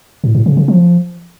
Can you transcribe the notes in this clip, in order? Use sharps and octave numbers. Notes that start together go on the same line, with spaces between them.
A2
A2
C#3
C#3
F3